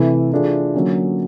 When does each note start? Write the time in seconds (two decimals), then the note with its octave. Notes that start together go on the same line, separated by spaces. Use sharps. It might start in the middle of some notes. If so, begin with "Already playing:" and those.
Already playing: C3 E3 A3
0.32 E3 A3 D4 F4 G#4
0.75 D3 F#3 A#3 C#4